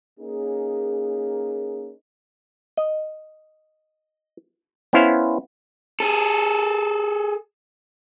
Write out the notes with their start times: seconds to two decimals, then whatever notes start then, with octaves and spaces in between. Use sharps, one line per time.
0.20 A#3 C#4 D#4 G#4
2.77 D#5
4.93 B3 C#4 E4 C5 F5
6.00 G#4 A4